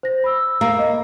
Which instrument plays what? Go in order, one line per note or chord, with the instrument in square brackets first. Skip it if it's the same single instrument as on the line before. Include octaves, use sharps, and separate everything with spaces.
[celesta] C5 A#6
B5 E6
[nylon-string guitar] A#3
[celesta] D#5